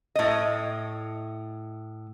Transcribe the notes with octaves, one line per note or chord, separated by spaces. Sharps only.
A2 D#5